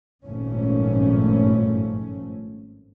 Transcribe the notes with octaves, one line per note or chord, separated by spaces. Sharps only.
G#1 G2 A#2 F3 A3 C#4